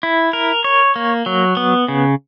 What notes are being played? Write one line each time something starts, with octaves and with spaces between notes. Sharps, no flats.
E4
A#4
C#5
A#3
F#3
B3
C#3